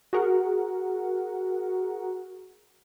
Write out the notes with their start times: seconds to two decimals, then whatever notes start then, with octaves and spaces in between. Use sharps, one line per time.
0.13 F#4 G#4 A#4 F#5